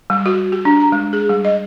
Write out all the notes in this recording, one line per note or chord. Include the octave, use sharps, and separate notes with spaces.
G3
F#4
G4
D4
A#5
G#3
G#4
G3
D#5